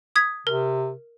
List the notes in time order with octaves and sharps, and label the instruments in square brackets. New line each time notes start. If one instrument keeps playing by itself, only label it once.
[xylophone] D#6 G#6 B6
[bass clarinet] C3 [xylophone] A#4